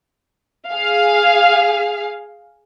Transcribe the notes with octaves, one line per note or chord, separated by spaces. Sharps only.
G#4 F5